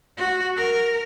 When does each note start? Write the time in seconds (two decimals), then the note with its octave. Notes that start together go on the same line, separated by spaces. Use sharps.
0.17 F#4
0.57 A#4